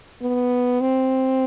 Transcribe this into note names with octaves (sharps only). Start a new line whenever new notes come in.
B3
C4